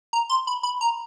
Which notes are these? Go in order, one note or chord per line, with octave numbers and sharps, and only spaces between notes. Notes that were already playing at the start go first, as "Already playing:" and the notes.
A#5
C6
B5
B5
A#5